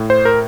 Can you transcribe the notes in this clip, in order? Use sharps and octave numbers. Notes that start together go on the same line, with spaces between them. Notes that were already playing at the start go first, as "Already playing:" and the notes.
Already playing: A2
C5
A#4